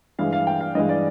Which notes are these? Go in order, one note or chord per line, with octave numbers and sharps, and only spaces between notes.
G2 E3 G#3 F5
F5
G5
F5
G2 E3 G#3 D#5
D5